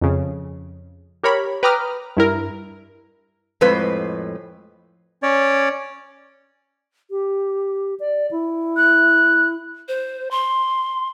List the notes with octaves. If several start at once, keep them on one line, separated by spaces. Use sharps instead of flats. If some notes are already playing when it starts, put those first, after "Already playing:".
F2 C#3
G4 A#4 C#5 B5
B4 G5 A#5 D6 D#6 F6
G2 E4 A#4
F2 A2 G#3 B4 C5
C#4 C#5 D5
G4
D5
E4
F#6
C5
C6